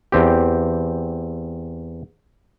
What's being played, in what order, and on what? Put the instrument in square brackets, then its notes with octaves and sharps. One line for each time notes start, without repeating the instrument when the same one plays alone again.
[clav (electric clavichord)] E2 C4 G4